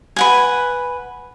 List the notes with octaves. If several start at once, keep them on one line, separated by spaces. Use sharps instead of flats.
B4 F#5 G#5